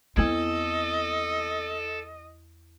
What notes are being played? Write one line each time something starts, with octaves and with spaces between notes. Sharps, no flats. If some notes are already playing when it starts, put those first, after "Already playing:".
E2 B3 C4 E4 A4 D#5 G#6